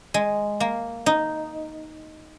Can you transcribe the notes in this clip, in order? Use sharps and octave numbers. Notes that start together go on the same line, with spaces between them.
G#3
A#3
D#4